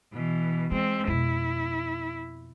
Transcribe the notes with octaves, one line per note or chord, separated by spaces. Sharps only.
B2 E3
E3 G#3 C4
F2 B2 E4